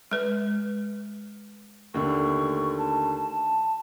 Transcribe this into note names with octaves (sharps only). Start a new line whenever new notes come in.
G#3 B4
D#2 D3 A3 C#6
A5